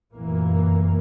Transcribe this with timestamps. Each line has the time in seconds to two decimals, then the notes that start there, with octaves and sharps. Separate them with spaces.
0.15 F1 F#2 A#2 E3 A#3